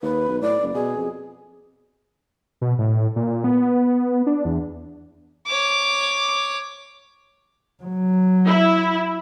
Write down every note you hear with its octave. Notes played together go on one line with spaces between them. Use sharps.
D#2 B4
B1
A2 D5
F#1
B2 G#4
F2
B2
A2
A#2
B3
B3
D4
E2
C#5 D6
F#3
E4